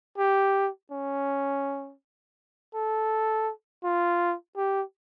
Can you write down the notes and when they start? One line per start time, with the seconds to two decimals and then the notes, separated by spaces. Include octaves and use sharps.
0.18 G4
0.91 C#4
2.74 A4
3.84 F4
4.57 G4